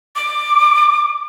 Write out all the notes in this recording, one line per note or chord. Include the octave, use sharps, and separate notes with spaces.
D6